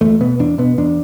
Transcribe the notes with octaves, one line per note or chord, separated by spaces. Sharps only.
E2 A3
B2 B3
E2 D4
B2 B3
E2 D4